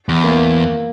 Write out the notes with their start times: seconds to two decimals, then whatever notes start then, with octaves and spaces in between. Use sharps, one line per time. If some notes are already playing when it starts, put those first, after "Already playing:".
0.09 E2
0.24 A#3